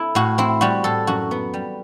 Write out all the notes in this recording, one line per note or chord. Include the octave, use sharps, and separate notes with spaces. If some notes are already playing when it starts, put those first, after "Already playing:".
Already playing: C4 E4 A4
A2 F#4
C4 E4
G3 F#4
A2 A4
F#2 F#4
B3
G3